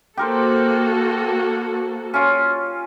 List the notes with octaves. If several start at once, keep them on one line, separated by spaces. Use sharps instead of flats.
A#3 F#4 G4 A4 A#4 C5
C#4 F4